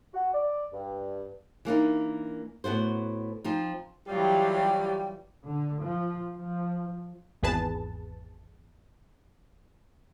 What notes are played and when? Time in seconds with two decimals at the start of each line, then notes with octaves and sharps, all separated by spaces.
0.14 F#4
0.33 D5
0.73 G2
1.65 E3 A#3 D4 D#4
2.64 A2 B3 F#4 C5
3.44 F3 C4 D#4
4.08 E3 F#3 G3 F4 G4
5.45 D3
5.83 F3
6.37 F3
7.43 G#1 E2 G#4 B4 A5